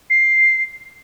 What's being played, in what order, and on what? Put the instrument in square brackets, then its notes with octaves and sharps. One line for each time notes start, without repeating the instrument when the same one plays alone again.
[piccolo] C7